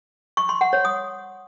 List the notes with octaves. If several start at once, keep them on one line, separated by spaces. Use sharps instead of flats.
C#6
C6
F#5
C#5
D#6